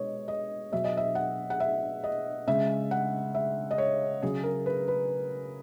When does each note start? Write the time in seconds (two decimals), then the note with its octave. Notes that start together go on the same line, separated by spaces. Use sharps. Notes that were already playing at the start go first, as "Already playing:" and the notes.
Already playing: B2 G#3 C#5 D#5
0.28 D#5
0.72 B2 F#3 E5
0.84 D#5
0.97 E5
1.15 F#5
1.50 F#5
1.60 E5
2.04 D#5
2.47 C#3 G#3 E5
2.91 F#5
3.35 E5
3.71 D#5
3.78 C#5
4.22 C#3 F#3 G#4
4.44 A#4
4.66 B4
4.88 B4